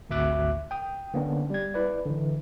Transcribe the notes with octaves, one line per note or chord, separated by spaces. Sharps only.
G#1 D2 F#4 E5 D6 F#6
G5 D#6
D3 A#3 B3 C#4 D4
G3 G#6
E4 B4 D5
D3 E3